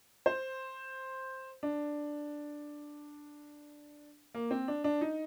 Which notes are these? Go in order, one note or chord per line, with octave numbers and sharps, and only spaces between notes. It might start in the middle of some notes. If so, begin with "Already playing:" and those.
C5
D4
A#3
C4
D4
D4
D#4